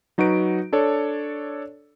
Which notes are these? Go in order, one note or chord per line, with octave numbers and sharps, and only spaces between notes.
F#3 D#4 F#4 B4 D7
D4 A4 C#5 D5